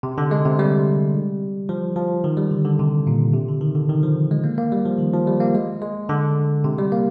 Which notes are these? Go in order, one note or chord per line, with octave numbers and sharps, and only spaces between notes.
C3
D3
G#3
C3
G3
F3
F3
D#3
G3
D3
D3
C3
A#2
C3
D3
D#3
D3
D#3
F3
G#3
A#3
A#3
G3
F3
D#3
F3
G3
A#3
G#3
G#3
D3
C3
G3
A#3